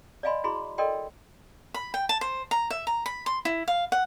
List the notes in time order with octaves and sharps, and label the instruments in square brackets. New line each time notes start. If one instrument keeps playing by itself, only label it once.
[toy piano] D5 D#5 F5 G#5 B5 C6
E4 F#4 G#4 B5 C6
A4 A#4 D5 D#5 G5 C6
[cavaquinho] B5
G5
A5
C5
A#5
E5
A#5
B5
C6
E4
F5
F#5